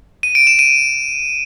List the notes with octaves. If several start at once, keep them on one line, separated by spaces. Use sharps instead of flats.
D#7
D7
E7
D#7